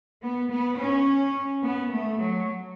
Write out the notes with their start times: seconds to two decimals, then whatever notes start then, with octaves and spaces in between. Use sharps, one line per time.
0.22 B3
0.51 B3
0.78 C#4
1.62 B3
1.91 A3
2.19 F#3